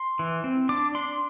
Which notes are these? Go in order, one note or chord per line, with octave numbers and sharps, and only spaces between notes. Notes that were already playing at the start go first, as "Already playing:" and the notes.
Already playing: C6
E3
C4
D4 D6
D4 C6